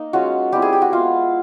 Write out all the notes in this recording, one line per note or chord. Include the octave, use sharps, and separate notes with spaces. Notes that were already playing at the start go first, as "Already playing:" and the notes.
Already playing: A#3 D#4
G#3 C#4 F4 F#4
G3 C4 E4 G4
G#4
G4
F#4
G#3 B3 E4 F4